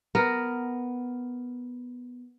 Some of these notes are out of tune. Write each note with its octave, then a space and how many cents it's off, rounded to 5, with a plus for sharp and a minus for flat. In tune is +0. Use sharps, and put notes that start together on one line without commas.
B3 +0 A#4 +0